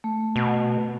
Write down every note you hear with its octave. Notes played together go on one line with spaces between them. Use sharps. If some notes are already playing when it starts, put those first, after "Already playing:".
A3
B2